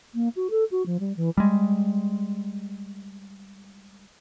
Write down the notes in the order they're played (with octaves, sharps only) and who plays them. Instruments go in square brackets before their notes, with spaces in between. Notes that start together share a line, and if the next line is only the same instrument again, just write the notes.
[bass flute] A#3
F#4
A4
F#4
F3
G3
E3
[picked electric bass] G3 G#3